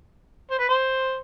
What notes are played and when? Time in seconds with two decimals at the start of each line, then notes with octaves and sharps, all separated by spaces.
0.51 C5
0.59 B4
0.69 C5